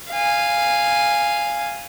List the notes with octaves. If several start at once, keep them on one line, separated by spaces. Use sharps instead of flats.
F5 G#5